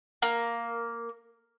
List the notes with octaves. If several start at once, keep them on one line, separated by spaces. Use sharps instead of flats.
A#3